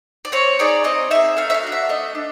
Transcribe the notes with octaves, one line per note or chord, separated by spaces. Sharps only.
D5
C4 C#5
D#4 G#4 D5
C4 D#5
D#4 G#4 E5
A3 F5
E5
F5
D4 F#4
E5
A3 D#5
D4